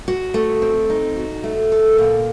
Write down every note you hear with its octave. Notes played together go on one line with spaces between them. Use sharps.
F#4
A3
C4
D#4
F#4
A3
A4
A#2